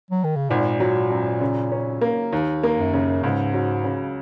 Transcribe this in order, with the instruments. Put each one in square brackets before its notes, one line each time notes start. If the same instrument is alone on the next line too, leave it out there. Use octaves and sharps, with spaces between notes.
[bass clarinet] F#3
D#3
C#3
[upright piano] G#1 [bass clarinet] A#2
[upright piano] F#3
F#2
C#3
C#4
A#3
D#2
A#3
[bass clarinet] F#2
[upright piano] C#3
[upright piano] C#2 [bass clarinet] G#2
[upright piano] F#3
C#3